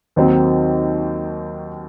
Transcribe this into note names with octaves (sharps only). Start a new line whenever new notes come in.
D#2 D#3 F#3 C4 D#4